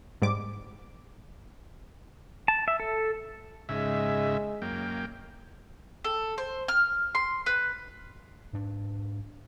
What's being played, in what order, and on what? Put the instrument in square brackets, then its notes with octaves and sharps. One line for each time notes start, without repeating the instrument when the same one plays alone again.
[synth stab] G#2 G3 D6
[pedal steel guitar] A5
E5
A4
[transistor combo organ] G#2 C#3 E5 [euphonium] G#3
[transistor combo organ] F#2 A#3 G5
[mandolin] A4
C5
F6
C6
B4
[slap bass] G#2 D4